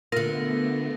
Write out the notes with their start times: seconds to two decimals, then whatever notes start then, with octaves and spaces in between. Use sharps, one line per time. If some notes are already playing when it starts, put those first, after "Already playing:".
0.12 D3 A3 B3 F4 A#4 A#6